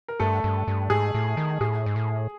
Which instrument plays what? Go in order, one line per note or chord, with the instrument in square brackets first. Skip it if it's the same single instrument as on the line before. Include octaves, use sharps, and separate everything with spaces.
[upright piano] A#4
[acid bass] G2 [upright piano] A3 A4
[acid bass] G2
G2
[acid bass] G#2 [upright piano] G#4
[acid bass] A2
D#3
[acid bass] A2 [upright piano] G#4
[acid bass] G#2
A2